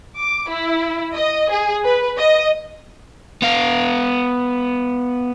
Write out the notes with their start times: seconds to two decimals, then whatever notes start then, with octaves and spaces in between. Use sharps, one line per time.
0.18 D6
0.50 E4
1.13 D#5
1.50 G#4
1.84 B4
2.17 D#5
3.42 B3 F5